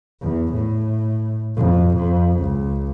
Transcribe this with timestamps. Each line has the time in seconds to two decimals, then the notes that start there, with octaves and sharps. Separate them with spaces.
0.21 E2
0.53 A2
1.56 F2
1.97 F2
2.40 C#2